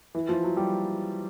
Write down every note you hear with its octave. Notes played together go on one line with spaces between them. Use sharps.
E3
F3
F#3
G3